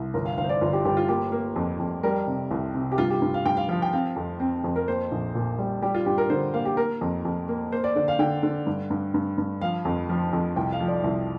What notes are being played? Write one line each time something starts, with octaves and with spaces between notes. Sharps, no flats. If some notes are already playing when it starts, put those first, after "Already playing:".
Already playing: C2
G1 A#4
F5
G1 F5
C5
D5
G1 F4
G4
G1 G4
F4
A#3 G4
A#3
F2
F2
G3 A#4
C3
C2
C3
G4
G2 F4
G4
G2
F5
G2 G5
F5
F3 F5
G5
C4 F5
F2
C4
F2
A#4
A#3 C5
A#1
A#2
G3
G3 G4
F4
G2 G4
A#4
D3 C5
A#3 F5
G4
A#3 A#4
F2
F2
A#3
A#3 C5
D5
D3 D5
F5
D3 G5
D3
G2
G2
G2
G2
F3 F5
F2
F3
F2
C2 G5
F5
F3
D5
C2